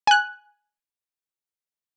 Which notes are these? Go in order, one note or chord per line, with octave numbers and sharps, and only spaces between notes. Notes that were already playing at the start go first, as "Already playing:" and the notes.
G#5 F#6